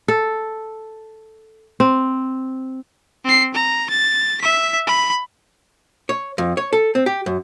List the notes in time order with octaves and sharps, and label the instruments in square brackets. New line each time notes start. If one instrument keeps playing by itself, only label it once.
[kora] A4
C4
[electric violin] C4 C7
A#5
A6
E5 B6
B5
[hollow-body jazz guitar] C#5
F2
C#5
A4
C4
G4
F#2